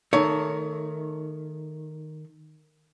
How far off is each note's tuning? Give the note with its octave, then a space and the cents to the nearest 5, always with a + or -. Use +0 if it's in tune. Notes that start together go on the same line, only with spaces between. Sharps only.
D#3 -10 A3 +0 C#5 +20